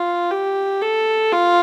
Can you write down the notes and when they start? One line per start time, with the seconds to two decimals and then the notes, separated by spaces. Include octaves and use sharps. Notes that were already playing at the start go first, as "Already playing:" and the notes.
Already playing: F4
0.31 G4
0.82 A4
1.32 F4